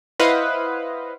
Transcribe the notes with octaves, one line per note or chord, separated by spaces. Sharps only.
E4 B4 C5 D#5 F5 F#5